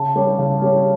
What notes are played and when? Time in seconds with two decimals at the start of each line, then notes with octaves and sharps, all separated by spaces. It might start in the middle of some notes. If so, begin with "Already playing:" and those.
Already playing: C#3 A5
0.16 G3 C#4 G4 C#5
0.39 C#3
0.61 G3 C#4 G4 C#5